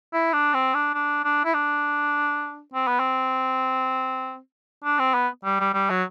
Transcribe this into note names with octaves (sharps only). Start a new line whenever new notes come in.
E4
D4
C4
D4
D4
D4
E4
D4
C4
B3
C4
D4
C4
B3
G3
G3
G3
F#3